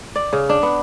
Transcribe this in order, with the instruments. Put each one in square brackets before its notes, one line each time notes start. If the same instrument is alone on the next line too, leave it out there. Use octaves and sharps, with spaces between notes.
[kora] D5
C#3
D4
B3